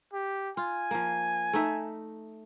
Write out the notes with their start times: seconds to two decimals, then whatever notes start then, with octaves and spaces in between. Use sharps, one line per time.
0.13 G4
0.57 F4 G#5
0.91 F3 A#3
1.53 A3 D#4 E5